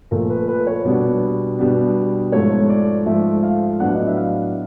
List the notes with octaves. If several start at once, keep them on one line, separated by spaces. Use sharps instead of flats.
A#2 F3 A3 A#4
B4
B4
C#5
B2 G3 B3 D4 D5
B2 G3 B3 D4
G#2 F3 A3 C#5
D5
G#2 F3 A3 E5
F5
A2 F#3 B3 D4 F#5
D#5
E5
F5